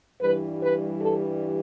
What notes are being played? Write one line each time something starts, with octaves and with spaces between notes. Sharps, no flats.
G2 E3 G3 B4
B4
A4